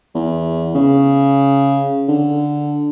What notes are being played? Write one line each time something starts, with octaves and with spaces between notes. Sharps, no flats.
E2
C#3
D3